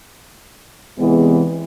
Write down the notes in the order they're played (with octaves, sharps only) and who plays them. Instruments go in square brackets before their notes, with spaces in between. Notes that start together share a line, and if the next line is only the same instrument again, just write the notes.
[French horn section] E2 C3 E3 G#3 B3